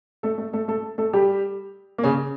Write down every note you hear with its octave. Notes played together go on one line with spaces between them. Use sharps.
A3 A4
A3 A4
A3 A4
A3 A4
A3 A4
G3 G4
A#3
C#3 C#4